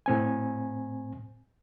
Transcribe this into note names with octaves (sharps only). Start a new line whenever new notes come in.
A2 C4 G#5